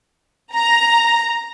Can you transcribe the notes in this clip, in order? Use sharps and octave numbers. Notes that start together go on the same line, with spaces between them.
A#5